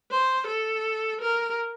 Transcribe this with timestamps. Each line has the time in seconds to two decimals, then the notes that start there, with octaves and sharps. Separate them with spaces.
0.11 C5
0.47 A4
1.21 A#4